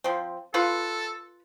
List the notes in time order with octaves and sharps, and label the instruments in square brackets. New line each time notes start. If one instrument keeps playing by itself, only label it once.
[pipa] F3 C4
[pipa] F4 B4 B5 [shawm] A4